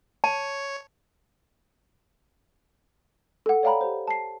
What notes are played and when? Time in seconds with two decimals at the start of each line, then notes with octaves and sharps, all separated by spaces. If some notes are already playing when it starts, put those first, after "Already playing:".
0.24 C#5 A5
3.46 A4 F#5
3.63 C#5 D5 F5 G5 A#5 B5
3.81 G4 C5
4.08 A5 C7